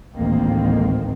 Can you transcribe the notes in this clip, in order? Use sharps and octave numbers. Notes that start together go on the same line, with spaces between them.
A1 D2 G#2 D#3 A#3 C4